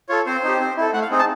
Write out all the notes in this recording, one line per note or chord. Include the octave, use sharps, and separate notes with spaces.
F4 A4 C#5
C4 C5
D#4 G4
C4
E4 A4
A3 F#5
F5
C4 D#4 G#4
A5